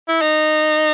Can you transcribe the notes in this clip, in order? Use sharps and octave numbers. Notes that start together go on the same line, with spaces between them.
E4
D#4